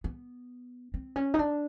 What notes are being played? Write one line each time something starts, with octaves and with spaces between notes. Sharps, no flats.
B3
C4
C#4
D#4
D4